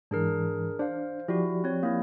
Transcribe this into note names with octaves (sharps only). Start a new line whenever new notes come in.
G#2 E3 D4 G#4 A#4
D4 C5 F5
F3 E4 F#4 G4 D5
C4 C#5
A#3 E4